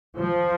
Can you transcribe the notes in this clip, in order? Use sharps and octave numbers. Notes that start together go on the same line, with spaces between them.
F3